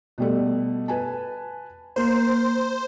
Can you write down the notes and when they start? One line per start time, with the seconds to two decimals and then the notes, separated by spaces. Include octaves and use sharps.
0.18 B2 G3 A3
0.88 B4 G#5 A5
1.96 A#3 C5